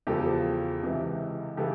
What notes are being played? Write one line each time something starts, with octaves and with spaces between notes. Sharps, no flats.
E2 C#3 F3 G4 A4
C#2 C3 E3
C#3 E3 G4 A4